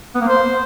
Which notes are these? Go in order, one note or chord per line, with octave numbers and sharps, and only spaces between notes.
B3
A#3
C5